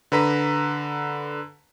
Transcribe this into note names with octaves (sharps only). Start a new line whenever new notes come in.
D3 B4 A#5 B6